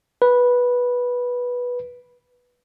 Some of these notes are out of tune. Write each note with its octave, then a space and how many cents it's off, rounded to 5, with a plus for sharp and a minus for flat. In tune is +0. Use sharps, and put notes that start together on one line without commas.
B4 -10